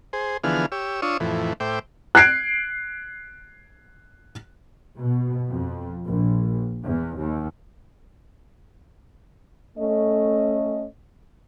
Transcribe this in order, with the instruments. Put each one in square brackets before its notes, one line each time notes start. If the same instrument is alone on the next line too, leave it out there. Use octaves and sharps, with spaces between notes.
[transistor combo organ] G#4 C5
D3 E3 F3 B3 G#4 F6
G4 C#5 E6
D4 F4 C#5 C#6 D#6 E6
F2 A2 E3
A2 C5 E5 G5 D6
[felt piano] F#6 G#6 C7 D7
[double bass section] B2
F2
A#1
E2
D#2
[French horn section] A3 C#4 D#5